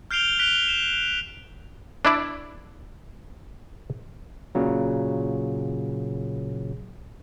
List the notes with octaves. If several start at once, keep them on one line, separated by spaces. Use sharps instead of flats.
F6 G6 C7 D7 F7 G7
F#6 B6 D7 F7 G7
E7
D4 E4 D5
A#2 C#3 F#3